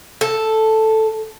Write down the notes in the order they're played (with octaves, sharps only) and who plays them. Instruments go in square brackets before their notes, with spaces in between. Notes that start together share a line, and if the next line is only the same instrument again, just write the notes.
[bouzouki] A4